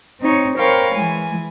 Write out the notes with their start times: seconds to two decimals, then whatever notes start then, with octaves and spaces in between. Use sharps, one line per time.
0.20 C4 D#4 C#5
0.57 A#4 C5 C#5 F5 G5 B5
0.93 E3 G#3 G#5